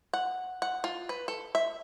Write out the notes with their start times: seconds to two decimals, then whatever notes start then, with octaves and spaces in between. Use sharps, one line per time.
0.13 F#5
0.62 F#5
0.84 F4
1.09 B4
1.28 A4
1.55 E5